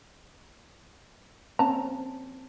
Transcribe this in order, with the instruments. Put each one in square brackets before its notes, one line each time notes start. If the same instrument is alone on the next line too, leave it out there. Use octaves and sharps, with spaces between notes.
[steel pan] A#3 C4 C#4 [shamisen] A5 A#5